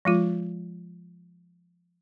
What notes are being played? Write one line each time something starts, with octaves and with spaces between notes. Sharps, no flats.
F3 G#3 F4